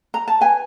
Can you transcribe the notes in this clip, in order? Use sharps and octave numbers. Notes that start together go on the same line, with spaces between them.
A#5
A5
B4 G#5